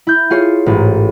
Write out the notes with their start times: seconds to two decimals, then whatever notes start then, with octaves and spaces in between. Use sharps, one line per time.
0.07 E4 G6
0.30 F4 G#4 C#5 C7
0.66 A1 G#2